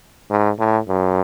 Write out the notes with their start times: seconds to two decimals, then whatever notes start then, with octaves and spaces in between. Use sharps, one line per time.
0.31 G#2
0.59 A2
0.88 F#2